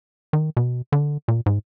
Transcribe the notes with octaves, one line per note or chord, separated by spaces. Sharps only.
D#3
B2
D3
A#2
G#2